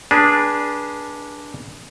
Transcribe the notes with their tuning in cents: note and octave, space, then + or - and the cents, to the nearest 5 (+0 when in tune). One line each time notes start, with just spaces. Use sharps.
D4 +0 G#4 +0 B4 -35